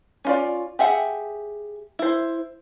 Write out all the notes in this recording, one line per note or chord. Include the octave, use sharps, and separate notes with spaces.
C#4 F4 D5
G4 G#4 E5 F#5
E4 C5